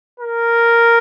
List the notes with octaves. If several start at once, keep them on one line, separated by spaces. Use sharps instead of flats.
A#4